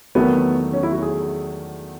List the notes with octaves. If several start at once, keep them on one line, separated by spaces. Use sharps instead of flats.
E2 D#3 F#3 A3 B3
C#4
E4
F#4
G#4